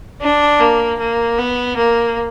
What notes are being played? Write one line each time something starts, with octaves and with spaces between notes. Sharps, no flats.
D4
A#3
A#3
B3
A#3